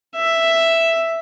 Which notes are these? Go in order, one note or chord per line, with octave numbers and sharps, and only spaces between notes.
E5